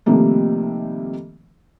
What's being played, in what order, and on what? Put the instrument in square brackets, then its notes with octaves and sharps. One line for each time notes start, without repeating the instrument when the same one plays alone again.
[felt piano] C3 D#3 F3 G3 A3 A#3